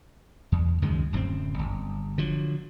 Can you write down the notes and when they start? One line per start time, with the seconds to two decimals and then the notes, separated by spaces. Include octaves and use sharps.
0.52 E2
0.82 C#2 F#2 D#3 G#3
1.13 D1 F#2 A3 C4
1.59 G1
2.18 D3 F3 F#3